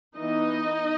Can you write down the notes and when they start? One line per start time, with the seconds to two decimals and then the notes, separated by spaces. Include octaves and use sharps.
0.17 E3 B3 D#4 D#5